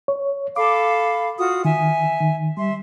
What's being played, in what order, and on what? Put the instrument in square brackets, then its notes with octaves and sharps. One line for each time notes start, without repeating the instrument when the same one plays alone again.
[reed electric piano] C#5
[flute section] A4 F5 B5 [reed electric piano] D6
[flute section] F4 F#4 D#6
[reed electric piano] D#3 [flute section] E5 G#5
[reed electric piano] D#3
[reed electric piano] G3 [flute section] E5 C6